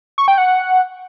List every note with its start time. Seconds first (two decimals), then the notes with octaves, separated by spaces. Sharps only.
0.18 C#6
0.28 G5
0.38 F#5